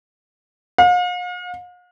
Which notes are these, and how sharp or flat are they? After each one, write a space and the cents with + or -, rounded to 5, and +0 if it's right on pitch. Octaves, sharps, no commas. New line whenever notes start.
F5 +45